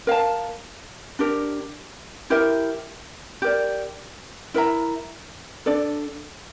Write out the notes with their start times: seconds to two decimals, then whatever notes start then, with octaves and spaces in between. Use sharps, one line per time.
0.07 A#4 F5 A5
1.19 D4 G4 A#4
2.30 E4 G4 A#4 E5
3.42 G4 A#4 D5
4.54 E4 A#4 E5 A#5
5.66 D4 A4 D5